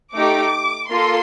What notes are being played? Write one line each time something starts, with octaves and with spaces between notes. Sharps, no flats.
A3 D#4 G4 D6
A#3 F4 A4 C6